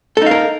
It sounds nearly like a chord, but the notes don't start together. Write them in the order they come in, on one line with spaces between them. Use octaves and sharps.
A4 D#4 F5 A#4